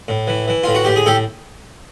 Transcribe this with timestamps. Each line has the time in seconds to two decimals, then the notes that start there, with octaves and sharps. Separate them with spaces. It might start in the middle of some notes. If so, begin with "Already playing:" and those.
0.08 A2
0.27 E3
0.48 E3
0.63 A2 F4
0.75 F#4
0.85 A2 G4
0.96 G#4
1.06 A2 G4 A4